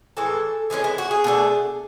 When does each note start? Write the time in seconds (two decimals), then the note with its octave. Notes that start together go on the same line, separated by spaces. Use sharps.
0.17 A2 E3 G#3 A4
0.70 E3 G#3 C#4 G#4
0.84 E4
0.98 F#4
1.11 G#4
1.24 B2 A3 D4